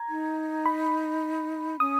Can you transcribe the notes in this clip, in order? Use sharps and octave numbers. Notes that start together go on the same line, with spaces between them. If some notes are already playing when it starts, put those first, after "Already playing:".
Already playing: A#5 G#6
D#4
B5
C#4 D#6